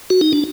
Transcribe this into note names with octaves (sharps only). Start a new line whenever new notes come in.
F#4
D#4
D4